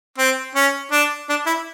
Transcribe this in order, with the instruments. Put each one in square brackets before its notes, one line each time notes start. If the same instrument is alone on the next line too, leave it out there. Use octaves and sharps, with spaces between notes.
[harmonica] C4
C#4
D4
D4
E4